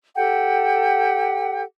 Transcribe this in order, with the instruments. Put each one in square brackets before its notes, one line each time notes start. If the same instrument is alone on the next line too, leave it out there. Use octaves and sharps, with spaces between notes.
[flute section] G4 A4 F#5 G5